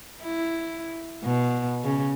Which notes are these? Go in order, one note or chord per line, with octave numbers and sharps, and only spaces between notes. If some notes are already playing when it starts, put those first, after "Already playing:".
E4
B2
C#3